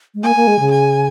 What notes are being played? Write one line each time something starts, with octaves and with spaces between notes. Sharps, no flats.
G#3
A#3 G#5
A#3
G#3
C#3
G#5